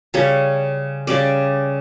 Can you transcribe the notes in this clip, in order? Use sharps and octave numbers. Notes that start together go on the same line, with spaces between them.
C#3 G3 C#4 C#5
C#3 G3 C#4 D5